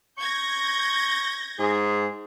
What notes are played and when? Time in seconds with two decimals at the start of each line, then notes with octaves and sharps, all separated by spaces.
0.18 C#6 G6 G#6 A#6
1.59 G#2 G#4